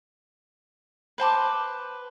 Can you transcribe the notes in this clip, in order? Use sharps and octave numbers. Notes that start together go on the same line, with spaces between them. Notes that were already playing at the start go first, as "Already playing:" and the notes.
B4 C5 A5 D6